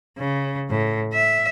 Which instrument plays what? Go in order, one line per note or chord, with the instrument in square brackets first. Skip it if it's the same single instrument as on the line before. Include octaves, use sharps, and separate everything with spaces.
[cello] C#3
A2
E5